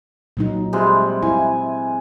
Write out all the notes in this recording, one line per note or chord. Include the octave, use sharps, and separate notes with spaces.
A#2 F#3 D#4
C3 G3 G#3
E4 G#5